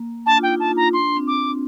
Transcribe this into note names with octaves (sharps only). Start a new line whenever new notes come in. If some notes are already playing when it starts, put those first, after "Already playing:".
Already playing: A#3
D4 A5
F4 G5
D#4
A5
F4
A#5
D4 C6
C4
D6